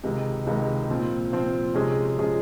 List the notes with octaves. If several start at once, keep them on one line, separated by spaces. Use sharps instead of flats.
C#2 C3 D#3 G#3 D#4
C#2 C3 D#3 G#3 D#4
A#2 F3 C4
A#2 F3 C4
C3 F3 G#3 C#4 G#4
C3 F3 G#3 C#4 G#4